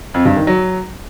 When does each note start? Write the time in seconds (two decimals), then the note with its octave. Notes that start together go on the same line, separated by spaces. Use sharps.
0.14 F2
0.25 G2
0.36 D#3
0.47 F#3